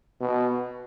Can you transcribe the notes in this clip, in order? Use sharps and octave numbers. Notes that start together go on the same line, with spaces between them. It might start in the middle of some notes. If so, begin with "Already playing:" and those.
B2